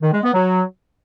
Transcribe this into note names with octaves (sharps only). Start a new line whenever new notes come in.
D#3
G#3
B3
F#3